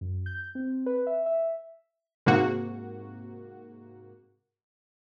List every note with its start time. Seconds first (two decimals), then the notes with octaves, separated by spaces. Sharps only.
0.01 F#2
0.26 G6
0.55 C4
0.86 B4
1.07 E5
1.26 E5
2.26 G#2 C3 A#3 F#4